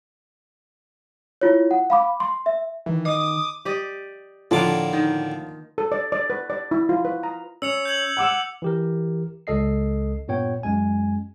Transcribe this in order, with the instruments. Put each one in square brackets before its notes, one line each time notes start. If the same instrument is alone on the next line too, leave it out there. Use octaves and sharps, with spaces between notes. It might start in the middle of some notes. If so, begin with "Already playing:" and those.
[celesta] E4 F4 C#5
F#5
F5 B5 D6
C6
E5
[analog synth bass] D#3 [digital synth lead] E3
[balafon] D#5 [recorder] D6 [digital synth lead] D#6
[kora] G4 D5 D#5
[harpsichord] A2 D3 D6 [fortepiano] F3 D4 [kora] A#3 F4
[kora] D#3
[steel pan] A4
D5
D5
B4
D5
E4
F4
B4
A#5
[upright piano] C#4 [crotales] E6 C#7 F7
[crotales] G6 G#6 F#7
[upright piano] F#5 D6 E6
[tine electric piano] E3 G4 A#4
C#2 A4 D#5 C7
G2 A#2 B3 C#5 G5
F#2 G#3 G#5